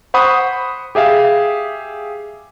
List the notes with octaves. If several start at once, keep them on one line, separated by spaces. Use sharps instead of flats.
C5 F#5 B5 C#6 D#6
G4 G#4 E5 F5